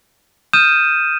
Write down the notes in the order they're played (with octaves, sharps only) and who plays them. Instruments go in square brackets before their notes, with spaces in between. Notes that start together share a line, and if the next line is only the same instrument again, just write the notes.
[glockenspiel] D#6 F6 G6 D#7 E7